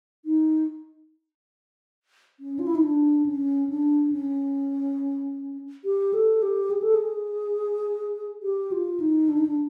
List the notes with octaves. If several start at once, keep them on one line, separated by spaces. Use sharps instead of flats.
D#4
C#4
F4
E4
D#4
D4
C#4
D4
C#4
G4
A4
G4
G#4
A4
G#4
G4
F4
D#4
D4
D#4
D4